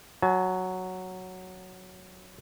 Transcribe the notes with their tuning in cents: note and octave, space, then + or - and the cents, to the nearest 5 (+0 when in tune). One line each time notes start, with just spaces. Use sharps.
F#3 +0 G#5 +45